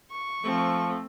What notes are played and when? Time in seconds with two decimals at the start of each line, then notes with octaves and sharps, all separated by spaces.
0.11 C#6
0.43 F3 A3 C4